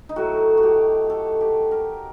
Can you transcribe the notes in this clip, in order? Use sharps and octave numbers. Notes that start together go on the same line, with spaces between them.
D#4
A2 F#3 A3 F#4
F#4
G4
A4
G4
A#4